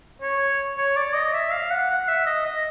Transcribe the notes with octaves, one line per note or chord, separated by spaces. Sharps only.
C#5
C#5
D5
D#5
E5
F5
F#5
F#5
E5
D#5
D#5